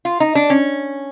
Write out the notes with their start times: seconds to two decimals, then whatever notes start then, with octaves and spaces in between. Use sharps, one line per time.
0.05 F4
0.20 D#4
0.35 D4
0.50 C#4